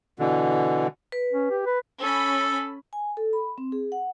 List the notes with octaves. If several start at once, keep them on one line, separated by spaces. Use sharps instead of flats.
B2 D3 E3
B4
C#4
G4
B4
C#4 A4 B5
G#5
A4
B5
C4
G#4
F#5